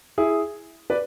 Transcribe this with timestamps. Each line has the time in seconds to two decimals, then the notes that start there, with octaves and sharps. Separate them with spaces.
0.18 E4 G#4
0.90 B4 D5